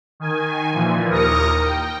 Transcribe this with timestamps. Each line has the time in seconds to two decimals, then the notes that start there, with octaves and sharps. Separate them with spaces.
0.20 D#3 G#5
0.72 A#2 E3 F3
1.10 D#2 A#4 D#6 A#6 C#7
1.62 G5